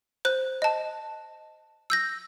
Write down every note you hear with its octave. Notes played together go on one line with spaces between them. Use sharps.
C5 F#6
D#5 A5
E6 G6 A#6